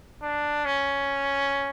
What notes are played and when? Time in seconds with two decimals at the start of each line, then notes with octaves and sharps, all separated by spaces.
0.22 D4
0.65 C#4